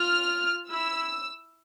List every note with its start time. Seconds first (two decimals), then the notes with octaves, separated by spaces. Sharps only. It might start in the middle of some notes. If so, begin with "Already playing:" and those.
Already playing: F4 F6
0.69 E4 E6